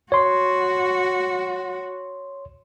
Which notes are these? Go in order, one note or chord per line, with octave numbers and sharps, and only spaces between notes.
F#4 C#5 C6